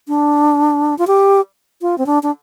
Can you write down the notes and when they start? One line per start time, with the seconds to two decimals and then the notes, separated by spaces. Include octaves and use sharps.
0.08 D4
0.98 F4
1.07 G4
1.82 F4
1.98 C4
2.06 D4
2.23 D4